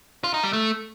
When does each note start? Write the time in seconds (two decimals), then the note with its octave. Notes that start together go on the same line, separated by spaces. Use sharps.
0.24 F4
0.34 D#4
0.44 G3
0.53 A3